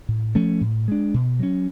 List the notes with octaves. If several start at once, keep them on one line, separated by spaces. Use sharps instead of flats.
A2
F3 A3 C#4
A2
G#3 D4
B2
F#3 C#4